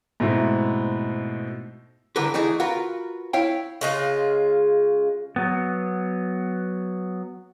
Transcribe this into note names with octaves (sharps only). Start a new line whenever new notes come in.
G#2 B2 A3 C4 E4
G2 D3 E3 A#4 B4
E3 A3 D#4 E4 G#4
F4 F#4 A#4 B4
E4 C#5 F5 G5
C#3 G#3 F4
F#3 B3